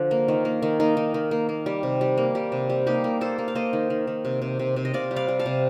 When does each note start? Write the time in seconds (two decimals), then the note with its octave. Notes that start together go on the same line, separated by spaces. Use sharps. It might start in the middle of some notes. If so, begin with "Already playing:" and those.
Already playing: D3 F3 D4
0.11 A#3
0.28 D#3
0.45 A#3
0.62 D#3
0.80 A#3 D#4
0.97 D#3
1.14 D#3
1.31 A#3
1.49 A#3
1.66 G3
1.83 C3
2.01 G3
2.18 A#3
2.35 G3
2.52 C3
2.70 G3
2.86 A#3 D#4 G4
3.04 A#3
3.21 A#3 A4 C5
3.38 A#3
3.48 F5
3.55 A#3 C5 D#5
3.73 D#3
3.90 D#3
4.07 D#3
4.25 C3
4.42 C3
4.59 C3
4.76 C3
4.85 D#5
4.94 C3 D5 F5
5.11 G3
5.16 D5 F5
5.28 G3
5.39 F5 A5
5.46 C3